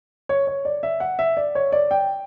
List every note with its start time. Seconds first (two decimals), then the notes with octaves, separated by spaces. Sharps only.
0.29 C#5
0.47 C#5
0.65 D5
0.83 E5
1.00 F#5
1.19 E5
1.37 D5
1.55 C#5
1.72 D5
1.91 G5